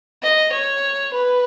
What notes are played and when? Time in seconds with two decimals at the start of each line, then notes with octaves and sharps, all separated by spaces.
0.23 D#5
0.52 C#5
1.13 B4